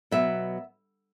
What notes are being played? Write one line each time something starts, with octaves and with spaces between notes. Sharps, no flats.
B2 F#3 B3 E5